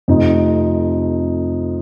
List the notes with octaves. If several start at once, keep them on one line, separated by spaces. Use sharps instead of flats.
F2 C3 F3 A3 D#4